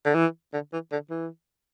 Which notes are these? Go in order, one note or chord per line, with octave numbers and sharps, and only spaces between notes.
D3
E3
D3
E3
D3
E3